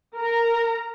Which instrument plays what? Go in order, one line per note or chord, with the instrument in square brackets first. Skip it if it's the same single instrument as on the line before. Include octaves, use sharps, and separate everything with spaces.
[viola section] A#4 A#5